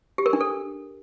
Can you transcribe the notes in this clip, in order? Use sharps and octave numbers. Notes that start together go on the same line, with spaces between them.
G4
A#4
D4
A4